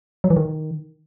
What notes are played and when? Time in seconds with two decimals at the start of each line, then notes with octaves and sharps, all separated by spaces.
0.24 F#3
0.30 E3
0.37 D#3